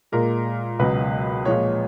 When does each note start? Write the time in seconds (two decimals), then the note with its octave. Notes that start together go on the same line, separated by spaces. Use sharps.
0.12 A#2 G#3 A#4
0.79 C#2 B2 F#3 B4
1.45 A#2 F3 G#3 C#5